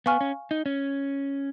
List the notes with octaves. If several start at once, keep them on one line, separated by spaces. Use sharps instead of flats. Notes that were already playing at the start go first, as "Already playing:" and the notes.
B3 F5 G#5 C#6 F6
C#4
D#4
C#4